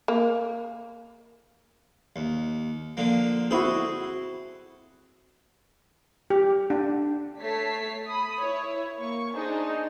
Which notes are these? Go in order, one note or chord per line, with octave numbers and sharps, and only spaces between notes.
A#3
D#2
D3 F3 A#3
C4 E4 F#4 G#4 A4
G4
D4
A3 A4 C#5 A5 B6 C7
B5 D#6
E4 C#5
A#3 C#6
D4 D#4 G#4 C5